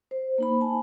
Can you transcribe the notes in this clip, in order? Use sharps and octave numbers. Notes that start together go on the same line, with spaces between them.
C5
A#3 D#4 B5
G#5 A5